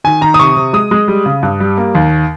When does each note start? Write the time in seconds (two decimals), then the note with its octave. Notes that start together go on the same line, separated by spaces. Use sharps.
0.04 D#3 G#5
0.21 D#3 A#5
0.34 D#6
0.39 C3 C#6
0.56 C3
0.73 G#3 D#6
0.91 G#3
1.08 G3
1.26 C#3
1.43 G2
1.60 G3
1.78 A#3
1.95 D#2